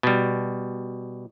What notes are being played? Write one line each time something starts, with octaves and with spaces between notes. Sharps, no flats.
B2 G3